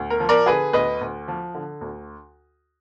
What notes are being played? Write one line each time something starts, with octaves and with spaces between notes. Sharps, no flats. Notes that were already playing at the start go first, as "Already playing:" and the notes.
Already playing: D2
A#4
F3
A#4 D5
D3 G#4 B4
D2 B4 D#5
D2
F3
D3
D2